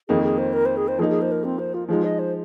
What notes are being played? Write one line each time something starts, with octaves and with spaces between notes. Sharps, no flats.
F2 D#3 A#3 D#4 G#4
G#4
C5
A#4
C5
G#4
C5
F3 A#3 D#4 G#4
G#4
C5
A#4
C4
C5
F4
F3 G#3 D#4 F4
D#5
C5